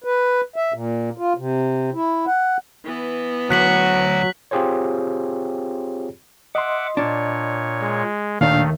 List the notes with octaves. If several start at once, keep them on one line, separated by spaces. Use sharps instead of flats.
B4
E5
A#2
F4
C3
E4
F#5
E3 B3
D2 F#3 F#4 F#6 B6 F#7
C4 F4 G4 G#4 C5 C#5
D#5 E5 F#5 C6 D6
A#2 D4 C#5
G#3
D#2 A#2 D#3 A3 D4 F5